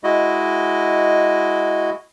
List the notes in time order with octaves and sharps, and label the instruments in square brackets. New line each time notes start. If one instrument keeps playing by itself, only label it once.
[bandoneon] G#3 E4 F#4 D#5